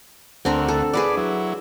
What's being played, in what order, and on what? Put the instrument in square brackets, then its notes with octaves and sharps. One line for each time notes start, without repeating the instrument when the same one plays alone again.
[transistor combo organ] D2 A3 F#5 [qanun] C4 D4 A#4
[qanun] A4
[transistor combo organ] D4 D5 [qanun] G#4 B4 F#5
[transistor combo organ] F#3 E4